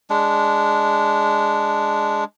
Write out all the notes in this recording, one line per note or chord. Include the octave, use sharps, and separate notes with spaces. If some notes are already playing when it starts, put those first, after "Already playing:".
G#3 D4